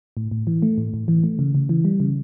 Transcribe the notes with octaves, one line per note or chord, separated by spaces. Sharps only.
A2
A2
E3
A3
A2
A2
E3
A3
C#3
C#3
E3
G3
C#3